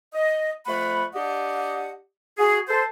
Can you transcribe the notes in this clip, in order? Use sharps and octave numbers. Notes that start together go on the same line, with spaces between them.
D#5
F2 A3 F#5 B5
D4 G4 D#5 F#5
F#4 G#4
A4 C5